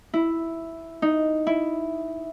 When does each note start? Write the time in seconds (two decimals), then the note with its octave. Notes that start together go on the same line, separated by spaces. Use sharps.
0.14 E4
1.02 D#4
1.47 E4